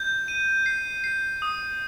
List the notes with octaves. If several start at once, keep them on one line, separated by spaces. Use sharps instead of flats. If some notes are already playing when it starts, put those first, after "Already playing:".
Already playing: G6
D#7
C7
C7
D#6